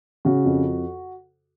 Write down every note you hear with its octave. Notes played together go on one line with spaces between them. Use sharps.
C#3 F#4
F2